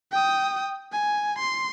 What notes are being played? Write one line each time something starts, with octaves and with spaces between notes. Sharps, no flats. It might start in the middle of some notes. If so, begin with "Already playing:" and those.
G5 D#6
G#5
C6